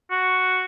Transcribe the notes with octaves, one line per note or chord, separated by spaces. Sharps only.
F#4